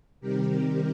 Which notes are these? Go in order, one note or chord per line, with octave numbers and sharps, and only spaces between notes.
C3 D#3 G3 C4 G4 A#4